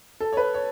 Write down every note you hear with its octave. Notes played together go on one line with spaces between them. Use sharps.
A4
C#5
B4
C#5